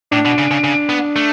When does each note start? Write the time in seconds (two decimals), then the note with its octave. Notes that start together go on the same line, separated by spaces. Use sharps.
0.12 A2 D4
0.25 B2
0.38 C#3
0.51 C#3
0.64 C#3
0.89 B3
1.16 A3